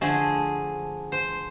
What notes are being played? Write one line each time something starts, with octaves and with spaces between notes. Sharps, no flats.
D3 F3 A3 G#4
C5